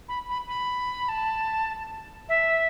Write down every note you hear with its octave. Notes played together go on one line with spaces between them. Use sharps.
B5
B5
B5
A5
E5